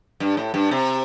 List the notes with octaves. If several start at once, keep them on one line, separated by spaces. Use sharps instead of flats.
G2
A2
G2
C3